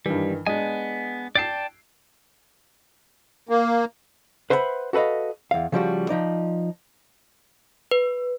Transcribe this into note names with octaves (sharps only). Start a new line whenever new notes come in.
G2 D#3 E3 G3
G#3 B3 D4 D#5 G#5
D5 G5 A5 C7 D7
A#3
B4 C5 E5 F#5 G#5 B5
F#4 A4 B4 D#5 F5
E2 F5
C#3 F3 G3 F#4
F3 D#4 D5
B4